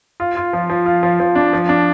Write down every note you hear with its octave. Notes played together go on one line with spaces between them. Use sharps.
F4
F4
F3
F3
F4
F3
F3
D4
F3
D4